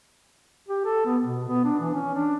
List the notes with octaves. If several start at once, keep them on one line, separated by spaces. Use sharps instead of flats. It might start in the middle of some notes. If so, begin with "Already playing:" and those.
G4
A4
B3
B2
B3
D4
E3
C#4
D4